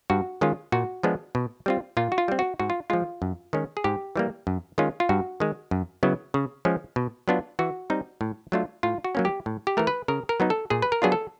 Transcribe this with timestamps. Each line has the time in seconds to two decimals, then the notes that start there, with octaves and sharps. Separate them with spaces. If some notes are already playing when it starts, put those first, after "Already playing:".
0.10 G2 F#4
0.41 D#3 G#3 C#4 F4
0.72 A#2 F#4
1.03 F3 G#3 B3 D4
1.35 B2
1.66 G3 C4 F4
1.97 A#2 F4
2.12 F#4
2.18 F4
2.28 G3 C4
2.39 F#4
2.60 G#2 F#4
2.70 F4
2.90 F3 G#3 F4
3.22 F#2
3.53 D#3 G#3 C#4
3.77 G#4
3.84 G#2 G4
4.16 E3 G3 A#3
4.47 F#2
4.78 D#3 G#3 C#4 F4
5.00 F4
5.09 G2 F#4
5.40 D#3 G#3
5.71 F#2
6.03 C#3 F#3 B3 E4
6.34 C#3
6.65 F3 G#3 C#4
6.96 B2
7.28 F#3 B3 D4 F4
7.59 E3 F#4
7.90 G3 C4 D#4
8.21 A2
8.52 F#3 A3 D4 F4
8.83 A2 F4
9.04 F#4
9.15 F#3 A#3 C#4
9.25 G4
9.46 A2
9.67 G4
9.77 E3 A3 A#4
9.87 B4
10.08 C#3 A#4
10.29 A#4
10.40 F#3 B3 D#4
10.50 A4
10.70 A#2 G#4
10.82 B4
10.92 A#4
11.02 F#3 B3 D4 F4 G#4
11.12 A4